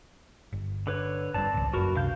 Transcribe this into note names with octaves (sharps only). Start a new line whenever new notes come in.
G1
D3 B4 C#5
G1 G2 C4 D5 A5
G#1 C#2
F#1 F#2 F#4 A#4 B4
C#2 C3 D4 F5 G6